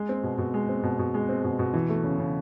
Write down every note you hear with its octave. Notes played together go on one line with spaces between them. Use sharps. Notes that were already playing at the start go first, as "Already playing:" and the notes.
Already playing: G#3
C4
B2
B2
G#3
C4
B2
B2
G#3
C4
B2
B2
E3
A3
C#3
C#3